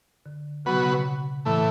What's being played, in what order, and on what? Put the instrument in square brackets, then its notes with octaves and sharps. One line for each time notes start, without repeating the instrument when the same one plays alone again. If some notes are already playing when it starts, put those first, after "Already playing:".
[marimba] D3
[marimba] C#3 [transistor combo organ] F#3 B3 F#4 B4
[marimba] B2
C#3
[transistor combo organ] A2 E3 A3